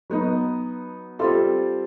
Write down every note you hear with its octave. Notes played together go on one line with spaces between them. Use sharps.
F#3 B3 D#4
G3 C4 F4 A4